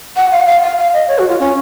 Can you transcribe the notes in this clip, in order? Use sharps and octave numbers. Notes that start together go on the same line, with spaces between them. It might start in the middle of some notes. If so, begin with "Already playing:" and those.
F#5
F5
F#5
F5
F5
F5
D#5
C#5
F#4
F4
C#4